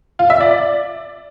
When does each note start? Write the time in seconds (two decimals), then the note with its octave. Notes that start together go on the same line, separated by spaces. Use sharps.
0.19 F4
0.30 E5
0.41 D5